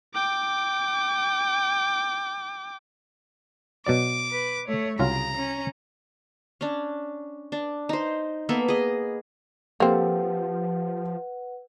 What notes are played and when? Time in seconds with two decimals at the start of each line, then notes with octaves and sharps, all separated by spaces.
0.14 G5 D6
3.86 B2 F#3 D5 D6
4.31 B4
4.68 A3 C#5
4.99 C2 C#3 F#3 F4 A#5
5.37 C#4
6.61 C#4 D4
7.52 D4
7.89 D#4 C5
8.49 A#3 B3 A4 E5
8.68 G#4 D#5
9.80 F3 A#3 C4 G4 A4 B4 F#5